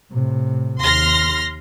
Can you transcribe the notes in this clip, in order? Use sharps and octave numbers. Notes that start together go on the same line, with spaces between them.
A2 C3
D#2 C6 F6 A#6